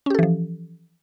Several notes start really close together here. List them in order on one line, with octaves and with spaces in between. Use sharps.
C#4 G4 A4 E3 F3